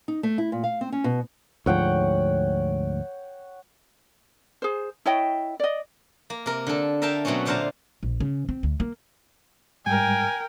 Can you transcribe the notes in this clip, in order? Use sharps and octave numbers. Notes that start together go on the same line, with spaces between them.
D#4
A3
E4
A#2
F5
C4
C#4
B2
D2 G#2 F3 C#5 F#5 G5
G#4 C5
E4 C#5 D#5 G5
D5 D#5
A#3
C3 A#4
D3 A4
A#4 E5 F5 G5 A5
B2 F#3 A3 C4 C#4
A#2 D3 C5 F5 A5 A#5
A#1
C#3
C4
D2
A#3
G#2 G3 G#3 A#4 G5 G#5